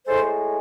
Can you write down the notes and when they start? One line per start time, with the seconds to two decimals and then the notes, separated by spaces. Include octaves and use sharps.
0.06 A2 G#3 A4 C5